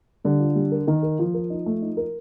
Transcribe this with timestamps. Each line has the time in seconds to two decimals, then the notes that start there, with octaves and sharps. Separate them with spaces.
0.24 D3 G3
0.40 F4
0.56 G3
0.72 A#4
0.87 D#3 A#4
1.03 A#4
1.19 F3 F4
1.34 A#4
1.50 D#4
1.66 A3
1.82 D#4
1.97 A#4